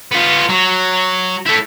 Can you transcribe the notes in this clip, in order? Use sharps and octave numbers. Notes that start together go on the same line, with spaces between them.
B3 F4
F#3
A3 E4